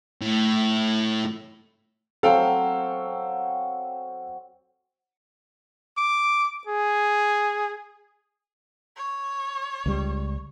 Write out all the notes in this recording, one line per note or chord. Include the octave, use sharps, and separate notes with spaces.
A2
F#3 C4 A4 F5 G5
D6
G#4
C#5
C#2 G3